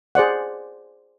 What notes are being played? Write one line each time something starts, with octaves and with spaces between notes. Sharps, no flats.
G#4 C5 D5 F#5